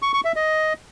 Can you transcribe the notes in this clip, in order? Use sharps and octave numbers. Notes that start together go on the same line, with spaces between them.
C#6
C#6
E5
D#5